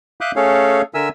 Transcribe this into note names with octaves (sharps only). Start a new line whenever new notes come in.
E5 F5 D6 D#6 F#6 G6
A3 C#4 G#4 A4 C#5 F5
D3 A#4 E5 G#5 E6